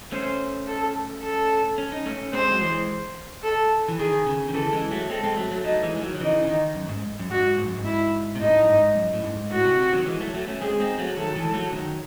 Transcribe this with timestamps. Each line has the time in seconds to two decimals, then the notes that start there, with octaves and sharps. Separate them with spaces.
0.12 A3 C#4 C5
0.67 A4
1.22 A4
1.78 C#4
1.92 D#4
2.06 A3 C#4
2.33 G#3 C4 C5
2.51 F#3
2.61 E3 G#3
3.43 A4
3.88 E3
3.99 D#3 G#4
4.26 C#3
4.48 D#3
4.54 C#3 E3 A4
4.72 E3 G#3
4.91 F#3 A3
5.10 G#3 C4 A4
5.24 G#3 C4
5.37 F#3 A3
5.51 F#3 A3
5.64 F#3 A3 D#4
5.83 E3 G#3
5.96 G#3
6.01 D#3 F#3
6.15 F#3
6.20 C#3 E3 D#4
6.43 C#3
6.47 D#3
6.75 F#2
6.89 G#2
7.19 F#2
7.30 G#2 F#4
7.58 G#2
7.67 F#2
7.75 G#2
7.85 E4
8.35 C3
8.41 A2 D#4
8.62 F#2
8.69 G#2
8.96 F#2
9.13 A2
9.24 G#2
9.51 A2 F#4
9.65 C3
9.79 C3
9.93 D#3 F#3
10.06 E3 G#3
10.20 F#3 A3
10.34 F#3 A3
10.48 A3 C#4
10.61 G#3 C4 G#4
10.80 C4 D#4
10.98 F#3 A3
11.17 D#3 F#3 A4
11.35 E3 G#3
11.54 F#3 A3
11.72 D#3 F#3